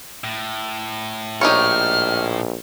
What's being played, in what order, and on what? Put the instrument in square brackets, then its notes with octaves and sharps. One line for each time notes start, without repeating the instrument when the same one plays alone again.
[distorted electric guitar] A2
[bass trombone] A#1 [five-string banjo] D#4 G4 C#5 [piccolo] F6